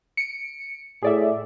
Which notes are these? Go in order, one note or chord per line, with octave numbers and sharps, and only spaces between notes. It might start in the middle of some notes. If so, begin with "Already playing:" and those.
C#7 D7
A2 G#4 D5 E5